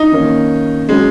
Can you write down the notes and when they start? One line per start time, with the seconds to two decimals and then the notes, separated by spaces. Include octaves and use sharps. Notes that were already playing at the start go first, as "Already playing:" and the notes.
Already playing: D#4
0.12 D#3 A#3 C#4
0.89 F#3 G#3 C#4